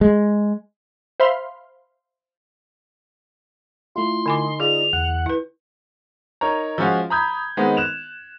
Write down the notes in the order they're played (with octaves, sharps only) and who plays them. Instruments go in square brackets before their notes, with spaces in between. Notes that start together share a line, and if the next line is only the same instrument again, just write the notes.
[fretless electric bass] G#3
[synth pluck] C5 E5 F5 B5 C6 F6
[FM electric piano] A3 E4 F4 [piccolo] C6
[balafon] D3 G#5 D6 [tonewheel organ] D#4
[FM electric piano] F4 D5 [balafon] G#4 [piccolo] F7
[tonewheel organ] E2 F#5 [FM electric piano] F#6
[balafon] E4 B4
[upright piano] D#4 A#4 C#5 A#5
F3 G#3 C#4 F4 F#4
A#5 B5 D#6 G6 G#6
D#3 G#3 B3 C4 D#4
F#6 E7 F7